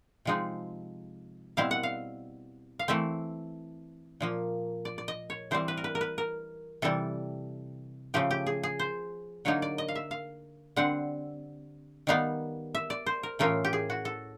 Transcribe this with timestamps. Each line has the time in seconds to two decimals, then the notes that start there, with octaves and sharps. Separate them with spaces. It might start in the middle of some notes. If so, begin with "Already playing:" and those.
0.25 C3 F3 G#3 C4 D#4
1.57 B2 G3 C4 E4 F5
1.71 F#5
1.83 F5
2.79 F5
2.88 E3 A3 C4 E5
4.20 A#2 F3 A#3
4.85 D5
4.98 D5
5.08 D#5
5.30 C#5
5.51 E3 G3 C4 C5
5.68 B4
5.77 A#4
5.84 B4
5.95 A#4
6.01 B4
6.18 A#4
6.82 C3 E3 G3 A4
8.14 C#3 F3 A3 G4
8.31 G4
8.47 G#4
8.63 G#4
8.79 C5
9.45 D3 F#3 A#3 D#4 C#5
9.62 D5
9.78 D#5
9.88 F5
9.95 E5
10.11 F5
10.76 D3 G3 C4 F#5
12.07 D#3 G3 B3 D#4 F5
12.75 E5
12.90 D5
13.06 C5
13.23 A#4
13.39 A2 E3 A3 C#4 F4 A#4
13.65 G4
13.73 G#4
13.90 F#4
14.05 A4